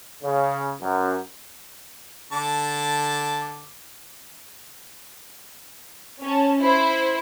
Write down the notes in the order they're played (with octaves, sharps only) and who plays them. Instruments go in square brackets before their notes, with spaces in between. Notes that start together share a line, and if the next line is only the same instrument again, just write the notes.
[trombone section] C#3
F#2
[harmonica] D3 A5 D6
[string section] C#4 A5
E4 C5